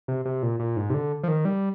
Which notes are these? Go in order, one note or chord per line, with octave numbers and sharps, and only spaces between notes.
C3
C3
A#2
A#2
G#2
C3
D3
F3
D#3
G3